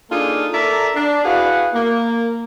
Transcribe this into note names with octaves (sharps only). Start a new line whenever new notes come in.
A#3 D4 D#4 F4 G#4 A4
A4 A#4 D5 E5 A#5
D4
E4 F#4 G#4 B4 F5 F#5
A#3